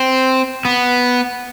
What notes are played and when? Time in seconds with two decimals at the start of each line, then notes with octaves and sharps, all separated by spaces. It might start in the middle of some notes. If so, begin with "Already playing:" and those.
Already playing: C4
0.65 B3